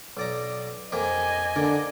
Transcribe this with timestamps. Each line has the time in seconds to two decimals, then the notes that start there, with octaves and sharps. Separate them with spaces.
0.17 B1 D5 A#5
0.92 F2 A#3 G4 D#5 G#5
1.56 D3 A#3 D5